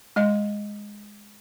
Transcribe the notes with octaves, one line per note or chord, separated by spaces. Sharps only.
G#3 D#5